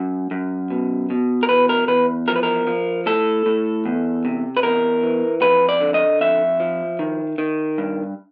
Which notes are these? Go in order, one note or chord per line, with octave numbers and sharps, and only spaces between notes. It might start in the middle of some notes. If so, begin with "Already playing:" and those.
Already playing: F#2
F#2
B2
B2
A#4
E2 B4
A#4
E2 B4
F3 A#4
B4
A#4
F3
A2 A4
A2
E2
C3
B4
E2 A#4
E3
F2 B4
D5
D3
D#5
F2 E5
F3
D#3
D#3
G2